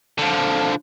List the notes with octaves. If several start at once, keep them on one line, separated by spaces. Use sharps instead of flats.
D3 F3